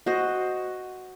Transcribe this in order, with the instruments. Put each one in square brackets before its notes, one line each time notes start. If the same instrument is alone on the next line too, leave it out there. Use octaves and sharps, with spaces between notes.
[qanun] F#4 C5 D#5